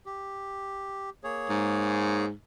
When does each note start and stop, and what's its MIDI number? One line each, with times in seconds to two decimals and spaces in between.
0.06 1.10 67
1.24 2.26 58
1.24 2.26 68
1.24 2.26 73
1.50 2.33 44